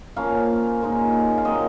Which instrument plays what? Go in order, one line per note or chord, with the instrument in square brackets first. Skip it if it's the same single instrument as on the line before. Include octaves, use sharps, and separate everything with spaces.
[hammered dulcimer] F3 A#3 C#4 F5
A#2 G#3 D#4
F5
A#2 F#3 C4 D#5